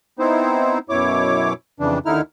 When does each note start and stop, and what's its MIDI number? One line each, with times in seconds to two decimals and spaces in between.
0.19 0.79 59
0.19 0.79 60
0.19 0.79 63
0.19 0.79 64
0.19 0.79 72
0.89 1.53 42
0.89 1.53 47
0.89 1.53 64
0.89 1.53 73
0.89 1.53 86
1.80 1.99 41
1.80 1.99 49
1.80 1.99 52
1.80 1.99 62
2.06 2.21 39
2.06 2.21 50
2.06 2.21 63
2.06 2.21 64
2.06 2.21 89